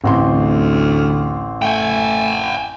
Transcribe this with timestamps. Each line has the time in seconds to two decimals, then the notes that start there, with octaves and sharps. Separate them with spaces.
0.04 A1 D2 C4 C6
1.62 A3 G5 G#5